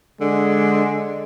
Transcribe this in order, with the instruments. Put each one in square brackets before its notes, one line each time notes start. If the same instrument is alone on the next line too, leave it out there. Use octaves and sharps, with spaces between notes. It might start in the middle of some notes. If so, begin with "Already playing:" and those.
[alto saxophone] D3 [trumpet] G#3